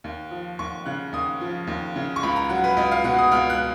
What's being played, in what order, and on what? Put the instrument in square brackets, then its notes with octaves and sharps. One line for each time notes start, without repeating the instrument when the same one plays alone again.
[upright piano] D#2
F3
D#2 C#6
C#3 F#6
D#2 D#6
F3
D#2
C#3
C#6
C#2 B5
A#5
F#3 F#5
B4
C#2 D#5
F5
B2 F#5
D#6
C#2 F6
F#6